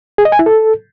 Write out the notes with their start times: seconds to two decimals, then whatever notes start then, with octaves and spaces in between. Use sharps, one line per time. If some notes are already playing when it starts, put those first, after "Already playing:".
0.18 G#4
0.25 D#5
0.32 G#5
0.39 E4
0.46 A4